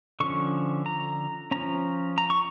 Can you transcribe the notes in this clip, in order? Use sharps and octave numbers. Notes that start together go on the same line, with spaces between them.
D3 F3 C#4 C#6
A#5
F3 C#4 A#5
A#5
C#6